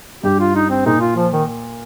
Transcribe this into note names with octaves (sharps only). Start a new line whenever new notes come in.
G2 G4
F4
D#4
C4
A#2 D#4
F4
F3
D#3